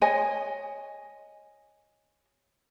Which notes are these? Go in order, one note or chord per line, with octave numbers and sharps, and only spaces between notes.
C#5 D#5 G#5